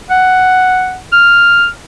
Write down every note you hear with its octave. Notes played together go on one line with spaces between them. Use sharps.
F#5
F6